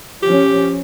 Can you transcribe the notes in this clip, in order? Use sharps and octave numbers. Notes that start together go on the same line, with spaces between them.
F3 C#4 G4